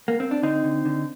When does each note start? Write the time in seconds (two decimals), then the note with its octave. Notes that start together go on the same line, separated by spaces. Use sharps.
0.08 A#3
0.20 C4
0.31 D4
0.43 D3 C4 D#4
0.64 D3
0.85 D3